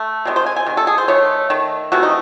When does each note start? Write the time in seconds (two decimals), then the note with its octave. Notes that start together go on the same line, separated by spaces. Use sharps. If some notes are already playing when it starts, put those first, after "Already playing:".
Already playing: A3
0.25 C3 D#3 G#3
0.36 C5
0.46 G#5
0.56 G#5
0.66 C3 D#3
0.77 A4
0.87 G#4
0.98 C5
1.08 D#3 A3 C#5
1.50 D#3 A3
1.92 C3 E3 A3 F#4
2.03 D#4